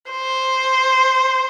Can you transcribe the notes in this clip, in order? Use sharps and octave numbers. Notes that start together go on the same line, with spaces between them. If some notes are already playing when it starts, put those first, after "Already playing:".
C5